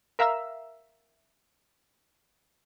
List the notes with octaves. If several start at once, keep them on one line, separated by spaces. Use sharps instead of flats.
A#4 E5 F5 A#5 E6